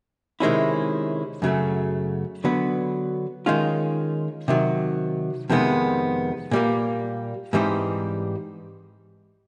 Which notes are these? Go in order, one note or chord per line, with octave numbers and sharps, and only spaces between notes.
C3 D#3 G#3 C#4 E4
F#2 C#3 F#3 A3
D3 F#3 B3
D#3 G#3 C#4 F4
C3 D#3 F#3
F2 C3 D#3 G#3 B3
A#2 G3 A#3
G#2 E3 G3 C4 D#4